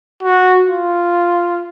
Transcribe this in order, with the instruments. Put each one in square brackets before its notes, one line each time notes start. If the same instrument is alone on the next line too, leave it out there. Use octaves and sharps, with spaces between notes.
[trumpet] F#4
F4